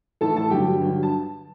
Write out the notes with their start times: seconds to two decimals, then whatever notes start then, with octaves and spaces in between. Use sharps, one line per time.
0.21 A2 E3 A4 A5
0.36 A4 A5
0.50 G2 D3 F#3 G4 G5
0.80 G2 D3 F#3
1.03 A5